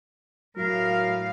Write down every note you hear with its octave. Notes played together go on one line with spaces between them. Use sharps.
A2 F#3 A#4 F5